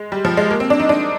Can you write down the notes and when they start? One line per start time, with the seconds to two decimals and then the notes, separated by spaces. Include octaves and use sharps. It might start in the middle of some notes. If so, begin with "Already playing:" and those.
Already playing: G#3
0.12 G3
0.25 F3
0.37 G#3
0.50 A#3
0.60 C4
0.70 D4
0.80 D#4
0.89 D4